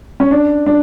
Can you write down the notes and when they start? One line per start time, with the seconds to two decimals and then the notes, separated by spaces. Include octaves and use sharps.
0.20 C#4
0.31 D4
0.66 D4